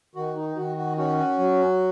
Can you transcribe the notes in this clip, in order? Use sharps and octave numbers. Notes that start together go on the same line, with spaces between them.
D#3 F#4
D#4
D#3 F#4
F#4
C#4 F#4
F#3